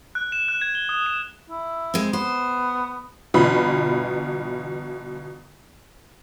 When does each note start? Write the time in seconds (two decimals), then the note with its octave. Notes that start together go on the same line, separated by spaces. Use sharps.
0.15 F#6
0.32 E7
0.48 F#6
0.61 G#6
0.75 G7
0.89 D#6
1.06 E7
1.50 E4
1.94 G#3 C4
2.13 B3 C5
3.34 G1 B2 E3 F4 B5